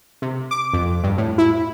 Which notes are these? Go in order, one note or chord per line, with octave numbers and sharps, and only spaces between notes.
C3
D6
F2
G2
A2
E4